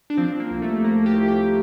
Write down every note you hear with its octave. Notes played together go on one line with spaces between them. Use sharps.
D4
F3 C4
A#3
C2
A3
C2 A#3
G4
F3
G4